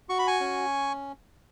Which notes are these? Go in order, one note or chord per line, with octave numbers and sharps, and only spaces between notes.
F#4 C#6
B5
G#5 C#6
C#4